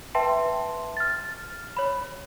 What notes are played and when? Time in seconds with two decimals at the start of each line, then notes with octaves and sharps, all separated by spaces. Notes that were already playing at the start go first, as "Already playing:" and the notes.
0.15 B4 E5 G5 A5 C6
0.97 F6 A6
1.77 C#5 B5